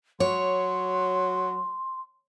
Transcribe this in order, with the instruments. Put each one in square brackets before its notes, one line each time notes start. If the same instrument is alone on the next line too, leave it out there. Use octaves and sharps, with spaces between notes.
[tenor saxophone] F#3 [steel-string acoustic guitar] C#5 [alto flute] C6